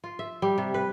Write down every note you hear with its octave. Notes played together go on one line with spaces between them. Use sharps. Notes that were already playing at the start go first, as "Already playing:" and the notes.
F4
E5
G3
C3
B4